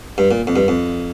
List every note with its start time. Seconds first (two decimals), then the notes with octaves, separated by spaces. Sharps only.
0.18 G2
0.31 A#2
0.47 F2
0.56 G2
0.68 F2